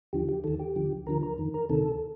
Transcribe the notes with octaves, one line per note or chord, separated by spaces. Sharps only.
D#2 D3 F3 G4
G4
D#2 D#3 A4
G4
D2 D3 F3
D2 D3 F3 A#4
A#4
F2 D#3
A#4
D2 C3 D#3 A4